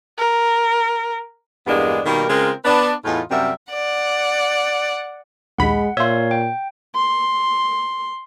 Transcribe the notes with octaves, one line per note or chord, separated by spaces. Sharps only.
A#4
E2 G2 G#3 A#3 B3 D4
B2 D#3 G3 A#3 A#4
C#3 G#3 C4 F4 A#4
B3 D4 D5
E2 A2 D#4 F4
F#2 C3 G3 F#4 A#4 E5
D5 F#5
A#1 D#2 G#3 F#5 B5
A#2 C5 C#5 E5 F5
G5
C6